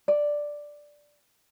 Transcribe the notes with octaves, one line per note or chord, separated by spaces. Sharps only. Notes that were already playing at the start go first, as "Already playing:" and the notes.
D5